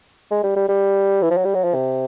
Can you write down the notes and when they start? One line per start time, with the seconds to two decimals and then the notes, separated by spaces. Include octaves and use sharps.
0.31 G#3
0.43 G3
0.56 G3
0.69 G3
1.22 E3
1.30 F3
1.37 F#3
1.45 G3
1.55 F#3
1.64 F3
1.74 C3